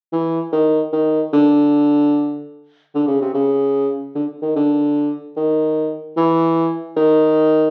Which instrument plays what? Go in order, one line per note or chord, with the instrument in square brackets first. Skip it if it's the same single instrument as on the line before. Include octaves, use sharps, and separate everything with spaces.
[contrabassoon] E3
D#3
D#3
D3
D3
C#3
C3
C#3
D3
D#3
D3
D#3
E3
D#3